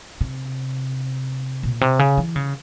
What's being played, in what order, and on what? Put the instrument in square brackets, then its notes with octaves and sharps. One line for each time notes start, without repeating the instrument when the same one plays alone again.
[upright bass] C3
A#2
C3
C#3
E3
C#3